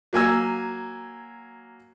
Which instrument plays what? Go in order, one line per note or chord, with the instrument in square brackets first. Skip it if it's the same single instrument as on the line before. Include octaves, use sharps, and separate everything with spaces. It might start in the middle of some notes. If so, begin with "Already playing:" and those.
[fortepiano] F#3 A#3 G#5 E6